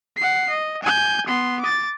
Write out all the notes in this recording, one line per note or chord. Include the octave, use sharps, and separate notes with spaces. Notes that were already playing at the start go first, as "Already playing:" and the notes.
F#5 C7
D#5
G#5 G6
B3 C6
D6 A6